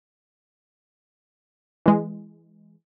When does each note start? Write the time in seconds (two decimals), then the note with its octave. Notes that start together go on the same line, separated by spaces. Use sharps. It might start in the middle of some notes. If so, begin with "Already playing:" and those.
1.86 E3 G#3